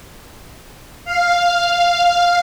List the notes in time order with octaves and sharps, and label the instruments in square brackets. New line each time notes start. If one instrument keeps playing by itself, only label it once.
[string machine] F5